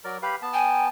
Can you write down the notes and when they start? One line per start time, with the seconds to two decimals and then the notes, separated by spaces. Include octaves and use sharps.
0.04 F#3 A#4 D5
0.22 G4 B4 F5
0.42 B3 A5
0.54 G5 G#5